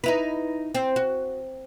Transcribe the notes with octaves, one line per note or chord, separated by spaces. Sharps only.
D#4 E4 B4
C4
F#4